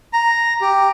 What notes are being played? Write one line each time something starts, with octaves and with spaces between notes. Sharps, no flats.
A#5
G4